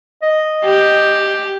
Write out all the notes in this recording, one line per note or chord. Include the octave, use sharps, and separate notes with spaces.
D#5
G4